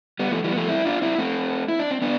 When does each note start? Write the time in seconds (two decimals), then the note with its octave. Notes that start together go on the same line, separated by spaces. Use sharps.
0.19 G3 B3
0.31 F3 A3
0.44 E3 G3
0.51 B3
0.56 F3 A3
0.68 C4 E4
0.85 D4 F4
1.02 C4 E4
1.18 A3 C4
1.68 E4
1.79 D4
1.91 C4
2.02 B3 D4